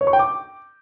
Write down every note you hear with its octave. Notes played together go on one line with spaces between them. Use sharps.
C#5
C#6
G5
D6